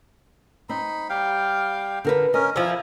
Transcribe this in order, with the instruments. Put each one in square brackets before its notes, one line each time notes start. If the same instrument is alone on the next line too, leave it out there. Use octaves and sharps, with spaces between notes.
[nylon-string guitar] C4 [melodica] D#4 B5
[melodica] G3 F5 G5
[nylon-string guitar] D3 A#4 B4
[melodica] C#4 A#4 [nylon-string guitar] D#5
[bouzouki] F3 E4 [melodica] G#5 A#5